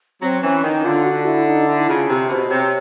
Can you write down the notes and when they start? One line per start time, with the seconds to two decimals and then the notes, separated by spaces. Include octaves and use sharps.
0.22 F#3 C4
0.43 E3 C#4
0.63 D#3 D#4
0.84 D3 F4
1.05 F#4
1.26 E4
1.47 D#4
1.67 E4
1.88 C#3 F4
2.09 C3
2.29 B2 C5
2.50 C3 C#5